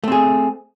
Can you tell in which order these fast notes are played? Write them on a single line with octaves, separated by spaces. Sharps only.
A3 C4 G#4